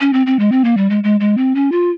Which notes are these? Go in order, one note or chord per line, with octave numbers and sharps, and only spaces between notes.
C#4
C4
C4
G#3
C4
A#3
G3
G#3
G#3
G#3
C4
C#4
F4